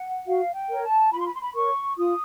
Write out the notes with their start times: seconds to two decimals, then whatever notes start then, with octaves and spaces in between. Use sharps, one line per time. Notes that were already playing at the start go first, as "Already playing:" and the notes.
Already playing: F#5
0.26 F#4 F5
0.54 G5
0.69 A#4 C#5
0.84 A5
1.12 F4 B5
1.19 C6
1.26 B5
1.35 C6
1.42 B5
1.54 A#4 C#5 C#6
1.97 F4 D#6